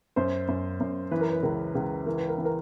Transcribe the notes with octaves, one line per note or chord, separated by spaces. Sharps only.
F#2 C5
F#2
F#2
E3 B4
A#4
B4
C#2 A#4
C#2
E3 A#4
B4
A#4
E3
A#4